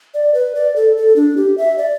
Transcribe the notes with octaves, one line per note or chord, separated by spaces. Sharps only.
D5
B4
D5
A4
A4
D4
G4
E5
D5